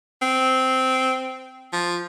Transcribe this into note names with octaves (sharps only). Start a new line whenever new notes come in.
C4
F3